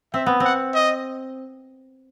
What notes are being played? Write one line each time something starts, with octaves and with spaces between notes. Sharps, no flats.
C4 E5
B3
C4 F#5
D#5